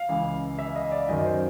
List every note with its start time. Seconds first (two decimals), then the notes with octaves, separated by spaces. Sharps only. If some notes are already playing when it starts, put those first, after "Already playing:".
Already playing: F5
0.09 C#2 C#3 E3
0.59 E5
0.76 D#5
0.92 D5
1.08 F#2 D#3 F#3 D#5
1.25 C5